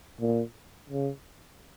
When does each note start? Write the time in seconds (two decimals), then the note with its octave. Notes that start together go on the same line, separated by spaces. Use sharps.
0.20 A#2
0.89 C#3